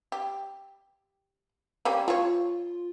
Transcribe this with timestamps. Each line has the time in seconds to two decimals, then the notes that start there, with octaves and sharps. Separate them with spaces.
0.12 G4
1.85 G3 A#3 C#4
2.08 F3 F4 C#5